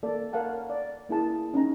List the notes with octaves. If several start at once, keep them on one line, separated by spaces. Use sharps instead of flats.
A#3 A4 D5
A#4 C#5 F5 F#5 A5
D5
A#3 E4 G#4 A5
C#4 D#4 A#5